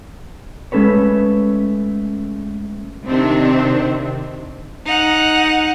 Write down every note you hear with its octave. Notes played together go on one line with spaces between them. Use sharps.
G#3 A3 C#4 A4 B4 C#5
C3 D#3 C4 D4
D#4 F#5